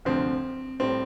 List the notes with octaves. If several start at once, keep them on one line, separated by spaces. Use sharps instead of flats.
D2 C3 F3 C4
A2 G3 C4